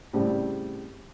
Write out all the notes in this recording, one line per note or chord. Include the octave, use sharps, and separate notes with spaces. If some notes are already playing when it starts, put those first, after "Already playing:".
A2 C#3 G3 C4